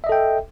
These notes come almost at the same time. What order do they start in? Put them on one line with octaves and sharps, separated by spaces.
E5 D#5 A4 G5